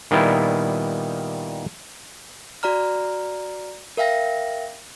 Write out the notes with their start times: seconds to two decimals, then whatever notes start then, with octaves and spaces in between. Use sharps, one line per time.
0.11 A#2 D#3 G3 B3 E4
2.63 F#4 D5 A#5 F6
3.97 A#4 E5 F5 G5 A#6